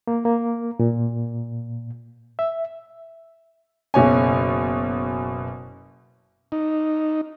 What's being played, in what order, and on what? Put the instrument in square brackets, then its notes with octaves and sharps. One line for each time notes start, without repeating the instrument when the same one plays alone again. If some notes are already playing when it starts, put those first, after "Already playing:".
[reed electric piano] A#3
A#3
A#2
E5
[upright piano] F#1 B2 C#5 G#5
[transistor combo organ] D#4